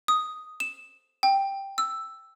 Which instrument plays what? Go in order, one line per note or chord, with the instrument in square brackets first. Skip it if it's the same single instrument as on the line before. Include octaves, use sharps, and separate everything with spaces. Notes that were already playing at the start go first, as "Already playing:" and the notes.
[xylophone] D#6
E7
G5
E6